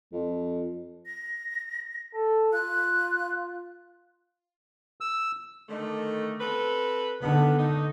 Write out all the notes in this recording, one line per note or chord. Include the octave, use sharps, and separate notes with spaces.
F2
A#6
A4
F4 F#6
E6
D3 D#3 A3
C4 A4 B4
D3 D#3 B3
A3 D#4